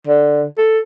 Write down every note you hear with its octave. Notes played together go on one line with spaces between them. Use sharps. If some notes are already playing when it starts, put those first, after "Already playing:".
D3
A4